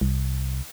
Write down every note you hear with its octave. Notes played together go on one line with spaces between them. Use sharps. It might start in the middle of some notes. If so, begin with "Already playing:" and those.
C2